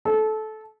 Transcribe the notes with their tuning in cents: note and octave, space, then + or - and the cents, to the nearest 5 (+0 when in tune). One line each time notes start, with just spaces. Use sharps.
A4 -20